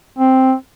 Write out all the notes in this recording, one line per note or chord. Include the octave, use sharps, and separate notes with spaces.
C4